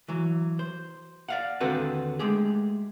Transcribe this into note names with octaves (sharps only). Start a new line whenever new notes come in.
E3 F#3
C5
D5 F5 F#5
D#2 D3 C4 F#4 A4 B4
G#3 A3 G4 G#4